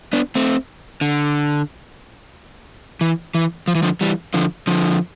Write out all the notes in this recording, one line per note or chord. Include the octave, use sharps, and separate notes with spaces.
B3 D4
A3 C4
D3
E3
E3
F3
E3
D3 F3
E3 G3
D3 F3
D3 F3